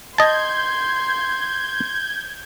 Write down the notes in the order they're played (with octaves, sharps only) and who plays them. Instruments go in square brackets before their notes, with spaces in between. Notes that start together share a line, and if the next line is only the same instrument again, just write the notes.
[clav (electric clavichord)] D#5 A5 [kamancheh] C6 [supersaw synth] G6 G#6